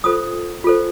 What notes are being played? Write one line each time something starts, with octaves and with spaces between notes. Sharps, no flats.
F4 A4 C5 D#6
F4 A4 C5